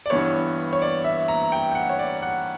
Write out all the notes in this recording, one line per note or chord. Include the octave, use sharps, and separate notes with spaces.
D5
G2 E3 B3 C#5
C#5
D5
E5
A#5
G5
G5
F#5
C#5
D5
F#5